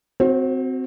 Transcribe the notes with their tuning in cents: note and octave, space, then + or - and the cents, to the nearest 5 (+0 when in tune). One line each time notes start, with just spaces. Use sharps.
C4 -15 F#4 +0 C5 +30